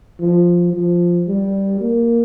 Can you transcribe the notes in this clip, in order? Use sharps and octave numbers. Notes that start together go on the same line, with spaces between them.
F3
F3
G3
A#3